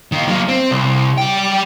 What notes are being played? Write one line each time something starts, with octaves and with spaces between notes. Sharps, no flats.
D#3 A#3
F#3 A#3
C4
C2
G3 G5